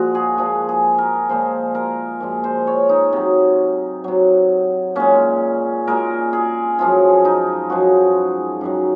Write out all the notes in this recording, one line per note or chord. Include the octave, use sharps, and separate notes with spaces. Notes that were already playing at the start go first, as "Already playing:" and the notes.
Already playing: A#2 F3 G#3 F#4
G#4
A#2 F3 G#3 G#4
G#4
A#4
A#2 F3 G#3 C5
A#4
A#2 F3 G#3
C5
C#5
D#4
C3 F#3
C3 F#3
A#2 G#3 C#4
A#2 G#3 A#4
G#4
F#2 F3 G#3 F4
D#4
F#2 F3 G#3 F#4
F#2 D#3 F#3